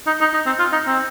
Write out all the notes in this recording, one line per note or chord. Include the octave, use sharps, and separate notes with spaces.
D#4
D#4
D#4
C4
F4
D#4
C4